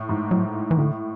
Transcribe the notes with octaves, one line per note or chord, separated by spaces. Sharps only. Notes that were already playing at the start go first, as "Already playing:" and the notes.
Already playing: A2
G#2
A2 F#3
E3
A2 D3